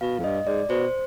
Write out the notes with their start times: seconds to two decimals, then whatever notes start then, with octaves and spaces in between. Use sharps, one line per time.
0.01 B2 F5
0.19 F2
0.24 G2 D#5
0.46 G#2 D5
0.70 B2 C5